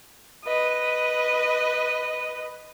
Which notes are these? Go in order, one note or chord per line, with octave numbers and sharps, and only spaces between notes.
B4 D#5